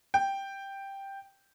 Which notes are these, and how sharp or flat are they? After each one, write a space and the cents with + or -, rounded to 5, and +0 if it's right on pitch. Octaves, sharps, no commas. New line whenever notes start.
G5 +0